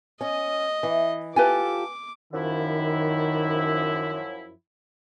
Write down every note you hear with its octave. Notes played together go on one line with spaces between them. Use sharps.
C#4 D#5
E3
F4 G4 A4 B4 G#5 D6
F#2 D#3 F3 E4